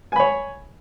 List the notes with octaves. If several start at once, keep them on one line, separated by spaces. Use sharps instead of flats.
C#5 G#5 B5